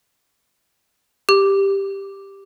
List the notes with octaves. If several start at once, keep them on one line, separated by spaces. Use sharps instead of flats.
G4